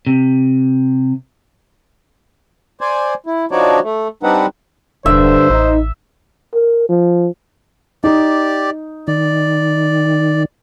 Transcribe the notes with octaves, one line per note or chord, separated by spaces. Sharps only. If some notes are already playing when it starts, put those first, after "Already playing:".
C3
C5 D5 G#5
E4
F3 D4 D#4 F#4 C#5 D5
A3
G3 C4 D4 D#4 B4 F#5
E1 G2 D3 C5 E5
A1 D#4
A#4
F3
D#4 G4 D5
D#3 D5